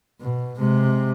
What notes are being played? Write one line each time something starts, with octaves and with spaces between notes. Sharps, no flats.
B2
C3 G#3